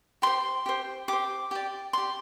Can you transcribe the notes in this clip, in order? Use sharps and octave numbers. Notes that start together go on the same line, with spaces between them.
G4 C5 C6
G4 C5
G4 C5 D6
G4 D5
G4 D5 C6